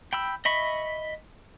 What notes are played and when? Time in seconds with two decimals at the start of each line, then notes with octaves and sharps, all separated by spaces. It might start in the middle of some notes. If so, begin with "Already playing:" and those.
0.13 G5 B5 E6
0.45 D#5 E5 B5 C#6